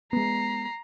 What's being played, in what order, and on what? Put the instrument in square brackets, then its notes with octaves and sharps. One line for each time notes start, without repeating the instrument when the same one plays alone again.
[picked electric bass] G#3 B3 [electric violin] A#5 C7